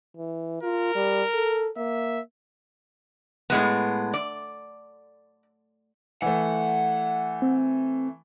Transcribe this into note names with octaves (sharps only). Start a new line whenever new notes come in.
E3
F4 A#4
G3
A4
A#3 E5
A2 G#3 B3
D5
E3 A3 F#5
C4